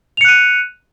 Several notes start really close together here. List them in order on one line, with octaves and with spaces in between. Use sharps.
F7 C#7 F#6 D#7